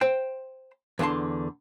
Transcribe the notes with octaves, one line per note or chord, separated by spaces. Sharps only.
C5 G5
E2 D3 F#5 A5 C6